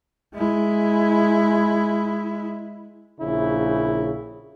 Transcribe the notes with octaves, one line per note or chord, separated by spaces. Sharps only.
G#3 E4
A#1 C#3 E4